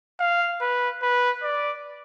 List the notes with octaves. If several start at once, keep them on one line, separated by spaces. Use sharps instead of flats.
F5
B4
B4
D5